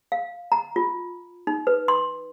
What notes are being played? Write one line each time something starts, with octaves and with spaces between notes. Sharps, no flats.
F5
A#5
F4
D#4
B4
C6